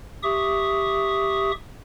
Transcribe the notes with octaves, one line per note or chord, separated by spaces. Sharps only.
G4 E5 C#6 D#6